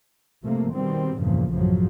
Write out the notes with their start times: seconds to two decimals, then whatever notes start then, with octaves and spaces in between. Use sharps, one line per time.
0.43 C3 F3 A3 A#3
0.72 B2 D#3 G3 C4
1.19 E2 G2 A#2 C#3 F3
1.52 A1 F#2 A2 C#3 F3 F#3